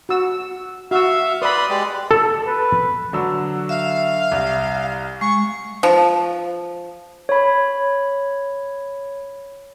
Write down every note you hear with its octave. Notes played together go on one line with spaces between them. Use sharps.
F#4 E6
F#4 E5 F5 E6
B4 D5 B5 C6 D#6
G#3 G4 D5
A4
B4
D3 F#3 E6
E5 F5
C2
G#3 C#6
F3
C#5 B5